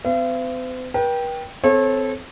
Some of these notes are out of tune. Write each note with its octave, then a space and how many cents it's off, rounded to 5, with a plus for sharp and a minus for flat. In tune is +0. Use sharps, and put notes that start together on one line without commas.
C4 -45 F5 -45
B4 -45 G5 +0
C4 -20 A4 -15 C#5 -35